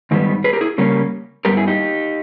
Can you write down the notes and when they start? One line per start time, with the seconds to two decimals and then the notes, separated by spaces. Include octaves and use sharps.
0.11 G#2 D#3 G3 B3
0.44 G#4 B4
0.53 G4 A#4
0.61 E4 G#4
0.78 C#3 G3 A#3 C#4
1.45 G2 G3 B3 G4 A#4
1.57 E4 G#4
1.67 D#4 G4